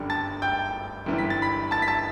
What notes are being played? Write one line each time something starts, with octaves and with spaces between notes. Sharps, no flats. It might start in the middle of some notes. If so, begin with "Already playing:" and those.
Already playing: G1 F#2 D3 G3
A5 A6
G5 G6
G1 F#2 E3 G3
B6
A6
B5 B6
A5 A6
B6
A5 A6